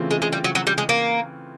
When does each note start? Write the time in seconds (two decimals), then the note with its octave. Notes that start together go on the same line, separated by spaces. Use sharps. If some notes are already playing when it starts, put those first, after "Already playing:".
Already playing: C#3 E3 A3 C4 F4
0.11 G#3
0.22 G#3
0.32 G3
0.44 F#3
0.55 F#3
0.67 G3
0.78 G#3
0.89 A#3